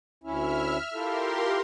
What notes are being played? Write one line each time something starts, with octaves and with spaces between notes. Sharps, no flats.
D2 C#4 E4 E5 F6
E4 F4 G4 A4 A#4 C6